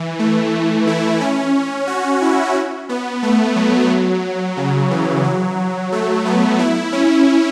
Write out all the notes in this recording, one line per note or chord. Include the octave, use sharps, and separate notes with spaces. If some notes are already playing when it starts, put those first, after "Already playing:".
Already playing: E3
A3
E4
C#4
F#4
E4
B3
A3
F#3
C#3
E3
F#3
A3
B3
E4
C#4